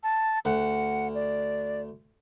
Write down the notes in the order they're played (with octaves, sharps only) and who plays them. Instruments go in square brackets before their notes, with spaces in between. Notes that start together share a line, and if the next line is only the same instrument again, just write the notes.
[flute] A5
[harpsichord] D2 [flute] F#5
[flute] D5